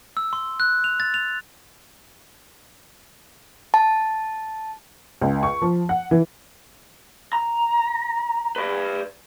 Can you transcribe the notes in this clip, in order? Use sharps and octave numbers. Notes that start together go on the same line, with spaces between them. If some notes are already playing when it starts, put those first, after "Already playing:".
E6
C6
F#6
F7
A6
F7
A5
C#2
C#6
F3
F#5
E3
A#5
B4 D5